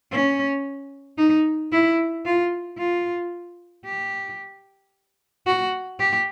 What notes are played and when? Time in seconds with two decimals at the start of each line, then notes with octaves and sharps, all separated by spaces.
0.11 C#4
1.17 D#4
1.71 E4
2.25 F4
2.78 F4
3.85 G4
5.46 F#4
5.99 G4